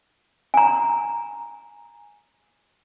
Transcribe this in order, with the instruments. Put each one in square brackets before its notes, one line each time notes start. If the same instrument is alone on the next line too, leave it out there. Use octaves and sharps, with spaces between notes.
[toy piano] G#5 A#5